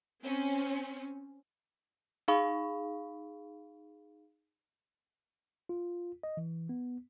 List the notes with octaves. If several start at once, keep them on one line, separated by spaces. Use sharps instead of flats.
C4 C#4
D#4 G#4 F5 B5 C#6 D#6
F4
D#5
E3
B3